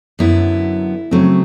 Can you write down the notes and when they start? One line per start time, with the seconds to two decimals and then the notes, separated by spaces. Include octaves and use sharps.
0.19 F#2 D3 F#3 B3 E4
1.11 C#3 F#3 A3 C4